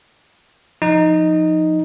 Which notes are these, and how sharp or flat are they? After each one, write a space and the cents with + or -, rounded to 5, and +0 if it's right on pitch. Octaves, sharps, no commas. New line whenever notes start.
F3 +10 D#4 +0